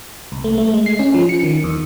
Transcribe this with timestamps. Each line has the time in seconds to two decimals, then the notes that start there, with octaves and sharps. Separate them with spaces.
0.32 C2
0.44 A3
0.58 A3
0.74 G#3
0.86 C7
0.99 C#4
1.14 F3
1.29 C#7
1.43 D#3
1.64 E2